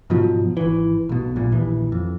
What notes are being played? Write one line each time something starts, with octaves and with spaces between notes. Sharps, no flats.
G#2 B2 F3 F#3
G#1 E3
B1 B2
A#1 A#2
A#1 D#2 E3
F2